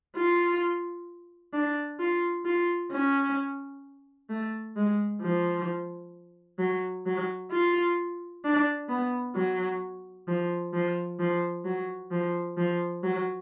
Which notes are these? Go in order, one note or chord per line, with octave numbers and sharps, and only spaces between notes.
F4
D4
F4
F4
C#4
A3
G#3
F3
F#3
F#3
F4
D4
B3
F#3
F3
F3
F3
F#3
F3
F3
F#3